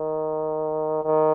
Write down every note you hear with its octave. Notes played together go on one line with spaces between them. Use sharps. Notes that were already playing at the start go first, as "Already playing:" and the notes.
Already playing: D#3
D#3